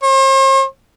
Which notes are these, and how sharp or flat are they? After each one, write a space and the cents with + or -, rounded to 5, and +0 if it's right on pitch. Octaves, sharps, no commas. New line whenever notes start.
C5 +45